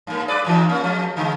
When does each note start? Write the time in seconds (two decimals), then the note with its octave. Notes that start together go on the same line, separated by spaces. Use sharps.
0.07 G2 A#3
0.28 G#4 B4 D5
0.45 G#2 E3 D#4
0.69 A#3 C#4
0.83 F3 G#3
1.17 D3 G#3